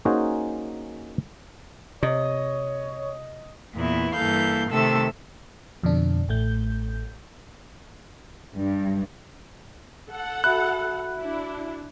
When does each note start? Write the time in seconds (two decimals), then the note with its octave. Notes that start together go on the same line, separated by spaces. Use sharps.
0.05 A#3 C#4 D#4 F#4 G#4 C5
2.03 C3 C#5 D#5
3.75 E2 A#2 E3 B3 E4
4.14 G2 E3 A#3 A4 F5 G6
4.70 C3 D#3 A3 A4 E6
5.83 F2 B2 D3 D4
6.28 A1 A2 A3 G6
8.55 G2
10.09 A4 F#5
10.44 F#4 E5 B5 F#6
11.17 D4 E4